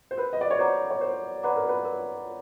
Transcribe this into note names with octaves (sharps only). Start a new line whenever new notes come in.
C5
A#4 B4
D#5
D5
C#5
C5 D5 F#5 A#5 D6
C#5
A#4 C5
B4 D5 F#5 A#5 D6
A#4
B4
A#4